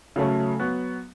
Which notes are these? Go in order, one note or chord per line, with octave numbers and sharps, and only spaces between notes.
C#3 F#3 A3 C#4
F#3 B3 F#4